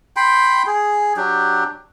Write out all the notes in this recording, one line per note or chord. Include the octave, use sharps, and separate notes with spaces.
G5 B5 C6
G#4
F#3 D4 G4